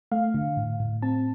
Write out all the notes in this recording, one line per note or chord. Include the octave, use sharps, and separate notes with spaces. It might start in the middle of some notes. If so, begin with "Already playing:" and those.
A3 F5
D3
A2
A2
C4 A5